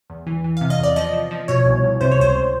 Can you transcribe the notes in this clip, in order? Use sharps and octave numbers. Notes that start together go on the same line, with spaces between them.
E2
E3
E3
F5
C3
D#5
E2 D5
F3 D#5
F3
F3
B2 C#5
C2
C2
C3 C5
C#5
C#2 C5
C#2